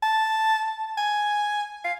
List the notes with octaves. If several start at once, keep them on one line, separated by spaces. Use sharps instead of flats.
A5
G#5
F5